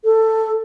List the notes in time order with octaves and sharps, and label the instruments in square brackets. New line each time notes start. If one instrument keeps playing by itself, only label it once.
[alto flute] A4